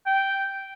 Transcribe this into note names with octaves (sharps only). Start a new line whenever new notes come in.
G5